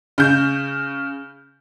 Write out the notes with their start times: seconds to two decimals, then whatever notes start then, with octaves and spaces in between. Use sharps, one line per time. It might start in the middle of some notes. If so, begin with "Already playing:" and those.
0.18 C#3 G6